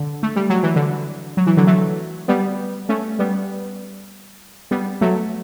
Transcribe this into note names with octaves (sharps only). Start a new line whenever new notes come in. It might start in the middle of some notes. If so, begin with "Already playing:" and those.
Already playing: D3
A3
G3
F#3
E3
D3
F#3
E3
D3 F#3
F#3 A3
G3 B3
A3 C#4
G3 B3
G3 B3
F#3 A3